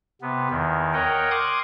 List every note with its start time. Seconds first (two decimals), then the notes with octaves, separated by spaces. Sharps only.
0.22 C3 B3
0.50 E2 D#3
0.93 A#4 C#5 D#5 F#5 G5
1.31 C6 D6 D#6 F#6 G#6